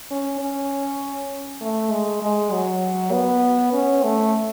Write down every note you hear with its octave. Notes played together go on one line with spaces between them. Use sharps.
C#4
C#4
A3
G#3
G#3
F#3
B3
C#4
A3